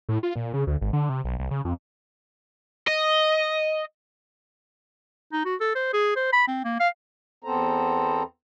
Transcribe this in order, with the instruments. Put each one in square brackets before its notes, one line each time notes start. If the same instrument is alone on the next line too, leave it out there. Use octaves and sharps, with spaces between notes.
[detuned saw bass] A2
F4
A#2
C#3
D2
G#1
D3
C3
B1
C2
C#3
F2
[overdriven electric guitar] D#5
[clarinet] D#4
F#4
A4
C5
G#4
C5
B5
C4
A#3
F5
[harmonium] E2 B3 C4 A4 C5 A#5